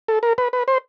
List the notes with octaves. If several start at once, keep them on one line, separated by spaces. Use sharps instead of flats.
A4
A#4
B4
B4
C5